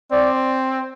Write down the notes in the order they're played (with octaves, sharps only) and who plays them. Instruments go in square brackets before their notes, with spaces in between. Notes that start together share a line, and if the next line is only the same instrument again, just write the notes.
[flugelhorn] C4 [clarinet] D5